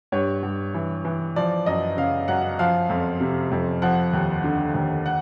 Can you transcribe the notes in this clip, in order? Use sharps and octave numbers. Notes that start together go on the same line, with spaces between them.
G2 C#5
G2
E3
E3
F3 D5
F#2 D#5
C#3 F5
F#2 F#5
F3 F5
F2
C3
F2
F3 F#5
D#2
D3
D#2
F#5